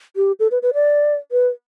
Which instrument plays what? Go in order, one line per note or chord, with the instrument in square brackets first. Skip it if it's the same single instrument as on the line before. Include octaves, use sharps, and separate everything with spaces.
[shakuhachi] G4
A4
B4
B4
D5
B4